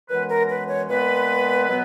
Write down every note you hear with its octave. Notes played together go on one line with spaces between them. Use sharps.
F#2 E3 G#3 B3 B4
A#4
B4
C#5
A#2 G#3 B3 B4
B2 F#3 B3